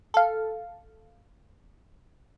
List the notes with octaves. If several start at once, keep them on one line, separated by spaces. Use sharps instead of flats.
A4 F5